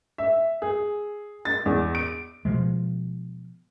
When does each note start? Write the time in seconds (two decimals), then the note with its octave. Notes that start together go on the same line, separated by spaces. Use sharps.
0.18 E5
0.62 G#4
1.45 A6
1.66 E2
1.95 D7
2.45 B2 F3 G#3